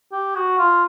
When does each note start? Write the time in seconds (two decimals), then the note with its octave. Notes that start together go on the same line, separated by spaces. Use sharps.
0.12 G4
0.35 F#4
0.59 F4